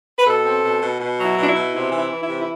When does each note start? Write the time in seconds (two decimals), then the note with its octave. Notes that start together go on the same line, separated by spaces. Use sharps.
0.18 B4
0.26 B2 A4
0.45 C4
0.63 B2
0.81 B2
1.00 B2
1.18 F#3
1.24 E4
1.37 B2
1.43 D4
1.48 E4
1.55 B2
1.73 C3 E4
1.92 E3
1.98 E4
2.10 E3
2.22 E4
2.28 C3
2.41 E4